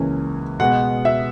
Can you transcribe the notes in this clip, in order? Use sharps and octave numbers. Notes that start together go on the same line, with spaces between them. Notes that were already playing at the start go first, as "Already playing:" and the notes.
Already playing: C#2 C#3 E3 A#3 C#4
B2 G#3 B3 F#5
E5